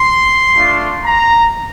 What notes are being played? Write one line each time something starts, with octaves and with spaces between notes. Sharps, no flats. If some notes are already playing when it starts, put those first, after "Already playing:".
Already playing: C6
A3 D4 F4
A#5